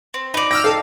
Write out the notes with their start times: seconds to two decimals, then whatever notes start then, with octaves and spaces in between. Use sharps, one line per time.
0.14 C4
0.34 D#4 D5 B5
0.51 G5 E6 F6 A#6
0.64 A4 F5